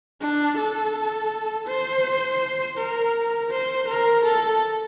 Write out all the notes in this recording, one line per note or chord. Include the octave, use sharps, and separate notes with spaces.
D4
A4
C5
A#4
C5
A#4
A4